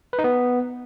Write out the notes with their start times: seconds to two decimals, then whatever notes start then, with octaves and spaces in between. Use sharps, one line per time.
0.13 B4
0.19 D#4
0.24 B3